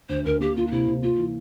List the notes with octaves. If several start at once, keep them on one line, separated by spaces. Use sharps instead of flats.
D2 C5
D2 A#4
A#3 G4
A#3 F4
D4
C3 E4
C3
A#3 F4
E3